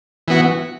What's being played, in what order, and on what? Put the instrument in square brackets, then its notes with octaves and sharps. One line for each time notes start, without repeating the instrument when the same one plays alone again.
[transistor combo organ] E3 B3 F#4